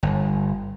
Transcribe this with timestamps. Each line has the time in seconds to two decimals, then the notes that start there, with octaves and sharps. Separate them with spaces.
0.03 G1